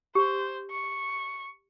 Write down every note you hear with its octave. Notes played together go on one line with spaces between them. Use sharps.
G4 C5
C#6